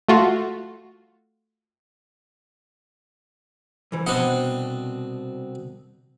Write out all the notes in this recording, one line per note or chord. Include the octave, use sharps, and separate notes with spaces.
A3 F4 F#4
C2 F2 E3
C2 B2 C4 D4 D#5 F#5